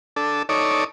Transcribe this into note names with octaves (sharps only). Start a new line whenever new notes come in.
D4 A4
D#4 A4 C#5 D5